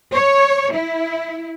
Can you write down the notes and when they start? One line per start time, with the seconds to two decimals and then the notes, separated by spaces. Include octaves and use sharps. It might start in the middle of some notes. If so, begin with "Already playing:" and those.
0.13 C#5
0.73 E4